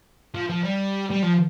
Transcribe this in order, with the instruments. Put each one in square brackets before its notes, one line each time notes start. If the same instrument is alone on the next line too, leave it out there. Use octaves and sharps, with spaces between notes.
[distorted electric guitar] F3
F3
G3
G3
F3